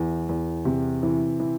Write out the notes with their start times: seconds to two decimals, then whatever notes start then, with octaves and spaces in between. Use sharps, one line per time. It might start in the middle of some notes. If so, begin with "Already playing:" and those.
Already playing: E2 E3
0.29 E2
0.65 C3
1.03 E3
1.40 E3